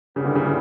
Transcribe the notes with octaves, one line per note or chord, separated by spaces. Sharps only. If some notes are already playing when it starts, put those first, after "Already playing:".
A#2 C#3 G3 B3 E4
D3
C#3
D3